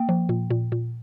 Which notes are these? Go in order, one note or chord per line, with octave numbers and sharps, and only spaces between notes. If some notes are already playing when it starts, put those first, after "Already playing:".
Already playing: A#3 G5
F3
A#2
A#2
A#2